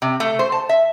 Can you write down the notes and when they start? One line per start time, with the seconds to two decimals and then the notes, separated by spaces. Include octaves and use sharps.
0.02 C3
0.20 A3
0.39 C5
0.52 A5
0.69 E5